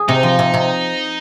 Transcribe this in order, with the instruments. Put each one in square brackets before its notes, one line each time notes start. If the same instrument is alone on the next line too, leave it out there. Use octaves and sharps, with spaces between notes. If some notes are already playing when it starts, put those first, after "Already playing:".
Already playing: [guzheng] G#4
[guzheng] C3 [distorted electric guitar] D#4
[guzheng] F3
C3
C3